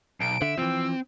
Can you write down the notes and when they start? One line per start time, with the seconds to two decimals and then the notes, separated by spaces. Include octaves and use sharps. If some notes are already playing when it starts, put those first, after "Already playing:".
0.20 B1 D7
0.42 D3 E5
0.58 E3 F3 C4 E6